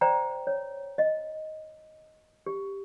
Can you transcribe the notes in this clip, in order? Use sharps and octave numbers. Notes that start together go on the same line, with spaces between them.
C5 D5 G5 A#5
C#5
D#5
G4